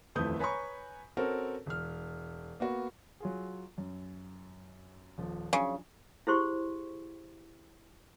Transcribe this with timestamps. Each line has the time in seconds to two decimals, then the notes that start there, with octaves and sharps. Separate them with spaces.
0.15 D#1 F2 E3 A3 D#6 G6
0.39 B4 C#5 G#5 A#5 B5 C#6
1.17 C4 C#4 F#4 A4 A#4
1.66 E1 F6
2.60 A#3 B3 F#4
3.20 F#3 F4 G#4
3.78 F#2
5.18 D#1 F3
5.53 C#3 F3 F#3 D4
6.27 E4 G4 G#4 C5 C6 C#6